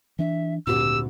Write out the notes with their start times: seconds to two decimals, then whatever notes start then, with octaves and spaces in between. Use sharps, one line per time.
0.19 E3 D4 E5
0.67 G#1 D2 A#2 G4 E6